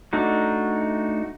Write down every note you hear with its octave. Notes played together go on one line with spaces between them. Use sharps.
A3 D4 D#4 F#4